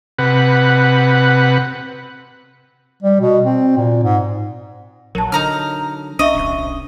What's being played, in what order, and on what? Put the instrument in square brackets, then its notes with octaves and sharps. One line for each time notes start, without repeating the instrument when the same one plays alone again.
[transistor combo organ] C3 B4 F#5
[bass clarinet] G3
B2
C4
A#2
G#2
[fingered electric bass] A#1 [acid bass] F#3 [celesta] A#4 A5
[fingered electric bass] D3 [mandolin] D#4 A#5 F6
[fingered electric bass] B1 C#4 D4 [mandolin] D#5 [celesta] E5 C#6 D#7
[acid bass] D1